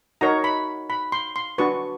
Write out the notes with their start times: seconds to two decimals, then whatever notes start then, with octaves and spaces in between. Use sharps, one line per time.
0.21 D#4 F#4 A#4 C#5 A#5
0.44 B5
0.90 B5
1.12 C6
1.36 C6
1.58 D4 F#4 B4 C#6